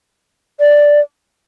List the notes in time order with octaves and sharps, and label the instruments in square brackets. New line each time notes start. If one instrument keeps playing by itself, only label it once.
[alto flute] D5